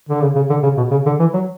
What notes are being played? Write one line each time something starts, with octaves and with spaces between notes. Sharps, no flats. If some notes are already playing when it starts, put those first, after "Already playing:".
D3
C#3
C#3
D3
C#3
B2
C#3
D3
E3
F#3